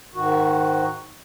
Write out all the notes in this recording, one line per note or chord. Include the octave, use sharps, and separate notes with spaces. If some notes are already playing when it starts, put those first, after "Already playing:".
G#2 D#3 F#4